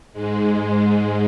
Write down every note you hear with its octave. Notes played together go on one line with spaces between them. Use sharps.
G#2 G#3